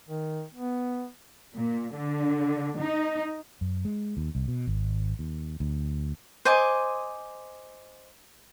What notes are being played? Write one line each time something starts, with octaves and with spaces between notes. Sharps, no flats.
D#3
B3
A#2
D3
D#4
F#2
G#3
D#2
C2
B2
G#1
D#2
D2
C5 D#5 G#5 D6